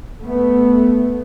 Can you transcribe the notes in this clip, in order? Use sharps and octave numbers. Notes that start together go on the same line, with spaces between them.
A3 B3